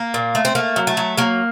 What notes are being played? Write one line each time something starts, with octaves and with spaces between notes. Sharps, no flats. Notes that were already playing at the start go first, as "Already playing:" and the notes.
Already playing: A#3
A#2
A3
C4
A3 A#3
F#3
A3
F#3
F#3 A#3